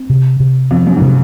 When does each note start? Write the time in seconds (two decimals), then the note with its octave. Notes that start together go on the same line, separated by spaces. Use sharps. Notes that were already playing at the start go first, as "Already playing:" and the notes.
Already playing: C4
0.10 C3
0.40 C3
0.71 F2 C4
0.87 F#2
0.97 G#2
1.02 C3